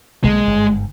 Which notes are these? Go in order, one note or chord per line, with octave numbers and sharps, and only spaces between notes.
B1 D3 G#3 A#3
G1 G#2